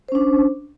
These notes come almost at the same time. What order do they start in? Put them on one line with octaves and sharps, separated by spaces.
C5 C#4 D4